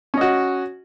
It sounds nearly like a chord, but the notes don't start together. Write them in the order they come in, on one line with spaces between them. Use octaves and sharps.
C#4 D#5 F#4